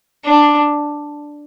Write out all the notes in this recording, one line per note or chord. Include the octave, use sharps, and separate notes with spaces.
D4